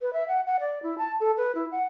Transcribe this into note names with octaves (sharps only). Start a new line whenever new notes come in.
B4
E5
F#5
F#5
D5
E4
A5
A4
B4
E4
F#5